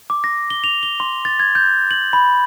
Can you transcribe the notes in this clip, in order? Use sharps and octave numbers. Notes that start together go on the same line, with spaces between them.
D6
A#6
G7
F7
G7
C6
A6
G#6
G6
F#7
B5